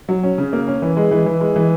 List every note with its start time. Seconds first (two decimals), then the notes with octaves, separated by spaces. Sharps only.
0.09 F#3
0.23 C#4
0.38 C#3
0.53 A#3
0.68 C#4
0.82 E3
0.97 G#3
1.11 E3
1.26 E3
1.41 G#3
1.56 E3